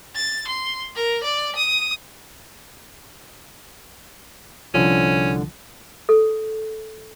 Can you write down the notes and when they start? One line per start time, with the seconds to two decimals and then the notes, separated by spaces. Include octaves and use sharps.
0.15 A6
0.48 C6
0.95 A#4
1.24 D5
1.56 D#6
4.74 C2 D3 F3 C#4
6.09 A4